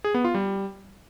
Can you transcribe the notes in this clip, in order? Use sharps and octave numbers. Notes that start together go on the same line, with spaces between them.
G#4
B3
F4
G3